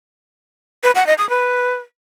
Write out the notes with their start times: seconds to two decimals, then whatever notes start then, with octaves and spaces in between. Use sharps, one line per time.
0.84 B4
0.95 F#5
1.07 D#5
1.18 D#6
1.30 B4